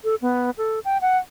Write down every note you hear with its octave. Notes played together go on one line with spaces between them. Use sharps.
A4
B3
A4
G5
F#5